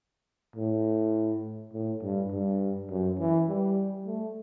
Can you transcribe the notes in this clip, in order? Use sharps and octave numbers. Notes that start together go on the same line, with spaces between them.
A2
A2
G2
G2
F#2
E3
G3
A3